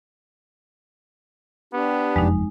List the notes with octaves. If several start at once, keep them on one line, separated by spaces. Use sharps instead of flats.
B3 D4 G4
F#1 F2 G#3 D#4